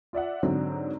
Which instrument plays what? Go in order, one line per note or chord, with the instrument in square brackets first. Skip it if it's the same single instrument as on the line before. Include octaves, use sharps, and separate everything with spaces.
[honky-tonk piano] F4 D5 E5 F#5
G#2 D3 F#3 C4